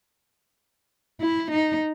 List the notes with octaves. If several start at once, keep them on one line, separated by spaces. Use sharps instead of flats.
E4
D#4